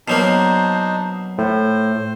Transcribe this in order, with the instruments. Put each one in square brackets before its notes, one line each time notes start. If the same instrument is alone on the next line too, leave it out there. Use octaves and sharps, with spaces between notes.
[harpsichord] B2 F#3 A#3 [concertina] D4 D#4 C5
[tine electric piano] A2 [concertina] C5